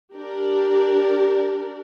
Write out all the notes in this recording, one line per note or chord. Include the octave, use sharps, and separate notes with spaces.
D4 G4 A#4 D5